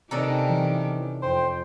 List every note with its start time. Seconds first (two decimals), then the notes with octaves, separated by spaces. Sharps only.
0.11 C3 D#3 C#4 D4 G4 A4 A#5
0.49 E3
1.22 F2 C5 G5